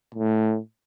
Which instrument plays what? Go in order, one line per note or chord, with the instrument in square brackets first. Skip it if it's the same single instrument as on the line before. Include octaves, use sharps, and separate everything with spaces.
[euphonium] A2